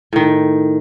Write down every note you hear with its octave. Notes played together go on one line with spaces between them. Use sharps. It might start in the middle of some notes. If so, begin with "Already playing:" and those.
A2 D#3